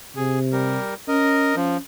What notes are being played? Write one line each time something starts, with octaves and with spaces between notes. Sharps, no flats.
C3 G#4
G3 A#4
C#4 A#4 D#5
F3 C#4